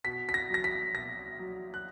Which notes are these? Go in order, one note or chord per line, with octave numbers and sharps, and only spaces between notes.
B2 B6
B6
A#6
F#3 A#6
B6
B2 A#6
F#3
F#6